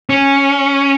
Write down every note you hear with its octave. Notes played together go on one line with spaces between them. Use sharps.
C#4